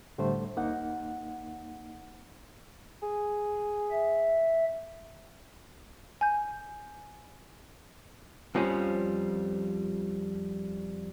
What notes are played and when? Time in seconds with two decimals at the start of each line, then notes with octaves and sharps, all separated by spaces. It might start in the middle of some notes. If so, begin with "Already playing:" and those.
0.18 A2 D3 G3 A3 D4 C5
0.57 D#2 A#3 D#4 F#5
3.02 G#4
3.91 E5
6.21 G#5 G6
8.55 F2 F3 G3 C#4